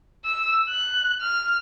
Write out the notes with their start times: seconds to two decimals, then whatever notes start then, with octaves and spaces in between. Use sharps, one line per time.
0.25 E6
0.69 F#6
1.21 F6